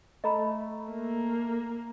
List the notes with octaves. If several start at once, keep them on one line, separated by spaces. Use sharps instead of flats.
A3 D#5 A#5 B5
A#3